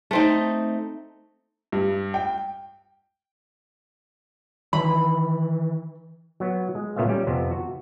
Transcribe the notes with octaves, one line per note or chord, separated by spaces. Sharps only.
A3 C4 D#4
G2
G5
D#3 E3 B5
F#3 B3
G#3
A#2 C#3 A3 B3 E5 F5
G3 C#4 G4
F2 C3 B3
F#4